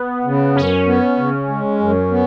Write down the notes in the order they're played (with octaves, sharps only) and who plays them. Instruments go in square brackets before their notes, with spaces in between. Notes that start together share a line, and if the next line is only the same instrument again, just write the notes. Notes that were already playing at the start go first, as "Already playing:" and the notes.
Already playing: [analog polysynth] B3
[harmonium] C#3
[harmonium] F#2 [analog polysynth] C#4
[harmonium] B3
C#3
G#3
F#2
B3